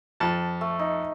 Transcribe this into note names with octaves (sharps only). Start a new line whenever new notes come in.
F2 A5
A3
D#4